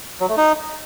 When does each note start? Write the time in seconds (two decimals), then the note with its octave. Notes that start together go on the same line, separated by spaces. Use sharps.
0.20 F#3
0.29 A3
0.37 D#4